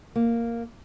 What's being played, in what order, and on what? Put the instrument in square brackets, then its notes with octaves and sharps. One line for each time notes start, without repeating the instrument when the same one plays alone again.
[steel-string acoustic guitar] A#3